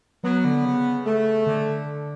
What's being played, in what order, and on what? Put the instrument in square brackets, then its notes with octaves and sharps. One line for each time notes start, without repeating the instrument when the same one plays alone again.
[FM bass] F#3 [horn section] B3
[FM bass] D3
C#3
[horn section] A3
[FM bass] D3